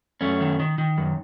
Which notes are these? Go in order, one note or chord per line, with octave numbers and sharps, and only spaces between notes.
F#2 A3 C#4
D#3
D#3
D#3
F#2